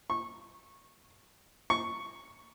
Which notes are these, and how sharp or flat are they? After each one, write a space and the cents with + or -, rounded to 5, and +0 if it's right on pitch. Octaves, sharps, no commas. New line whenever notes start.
C#6 -20
C#6 +0